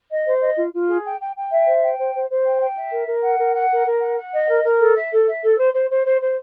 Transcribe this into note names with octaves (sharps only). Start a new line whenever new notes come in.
D#5
C5
D#5
F4
F4
G#4
G5
G5
G5
E5
C5
G5
C5
C5
C5
G5
G5
E5
A#4
A#4
F#5
A#4
F#5
A#4
A#4
F#5
F#5
D#5
A#4
A#4
A4
E5
A4
E5
A4
C5
C5
C5
C5
C5